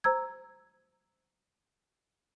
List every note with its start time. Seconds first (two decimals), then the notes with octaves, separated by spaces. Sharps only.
0.04 C5 A#5 E6 G#6